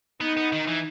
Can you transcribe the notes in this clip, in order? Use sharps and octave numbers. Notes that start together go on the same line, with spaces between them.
B3 D#4
B3
D#3
E3